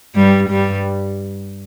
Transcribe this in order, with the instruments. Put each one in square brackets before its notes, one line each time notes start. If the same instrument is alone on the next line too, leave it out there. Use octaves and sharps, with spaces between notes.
[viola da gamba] G2 G3
G2 G3